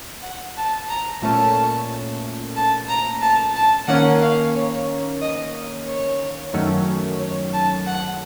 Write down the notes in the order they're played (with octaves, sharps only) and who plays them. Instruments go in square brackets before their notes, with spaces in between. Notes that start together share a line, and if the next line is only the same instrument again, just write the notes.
[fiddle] F#5
A5
A#5
[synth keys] A#2 A3 C#4 [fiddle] A5
[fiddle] A5
A#5
A5
A5
[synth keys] D#3 A#3 C#4 [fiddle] F#5
[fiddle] F5
C#5
D#5
C#5
[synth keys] F#2 D#3 F#3 A3 C#4
[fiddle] C#5
A5
F#5